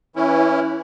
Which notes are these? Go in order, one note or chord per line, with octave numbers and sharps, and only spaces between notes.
E3 C#4 E4